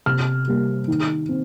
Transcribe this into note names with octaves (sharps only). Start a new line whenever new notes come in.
C3 F6
G3 A#3
D#3
C4